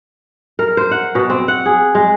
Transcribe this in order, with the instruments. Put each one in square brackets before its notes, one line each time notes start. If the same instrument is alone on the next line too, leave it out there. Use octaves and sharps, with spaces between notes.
[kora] A#4
C5
F#5
B2
C4
F#5
G#4
G#3